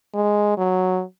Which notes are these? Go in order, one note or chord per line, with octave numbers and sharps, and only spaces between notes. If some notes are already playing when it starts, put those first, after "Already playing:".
G#3
F#3